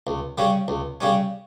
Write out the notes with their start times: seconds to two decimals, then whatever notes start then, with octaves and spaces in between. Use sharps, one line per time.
0.07 C#2
0.38 C#3 G3 C#4
0.68 C#2
1.01 C#3 G3 C#4